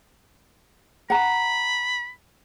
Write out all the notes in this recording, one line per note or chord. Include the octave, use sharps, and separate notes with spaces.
F#5 A#5 B5